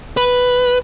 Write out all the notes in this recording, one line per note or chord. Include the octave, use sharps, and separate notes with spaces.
B4